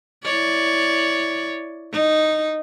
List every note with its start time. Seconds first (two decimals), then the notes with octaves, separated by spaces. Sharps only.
0.24 E4 C#5 D5
1.93 D#4